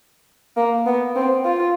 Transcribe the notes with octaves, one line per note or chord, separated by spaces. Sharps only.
A#3
B3
C4
F4